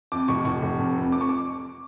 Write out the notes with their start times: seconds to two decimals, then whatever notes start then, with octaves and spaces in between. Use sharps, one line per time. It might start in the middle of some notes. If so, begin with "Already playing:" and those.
0.12 F2 D6
0.28 F1 C#6
0.45 F1 C#6
0.62 F1
0.79 F2
0.95 F2
1.12 F2 D6
1.21 C#6
1.29 D6